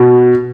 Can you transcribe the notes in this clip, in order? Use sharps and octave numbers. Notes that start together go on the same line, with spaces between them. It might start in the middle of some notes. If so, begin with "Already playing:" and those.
Already playing: B2